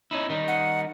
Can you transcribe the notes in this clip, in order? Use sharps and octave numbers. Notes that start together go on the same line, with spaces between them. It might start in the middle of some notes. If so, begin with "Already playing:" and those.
C#4 D#4 E4
D#3 G3 D#4
F#5